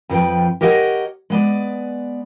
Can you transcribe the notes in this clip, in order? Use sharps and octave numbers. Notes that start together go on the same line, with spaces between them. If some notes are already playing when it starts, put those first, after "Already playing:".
F2 F3 B4 G5
G4 A#4 C#5 D#5 F5 F#5
G#3 B3 D5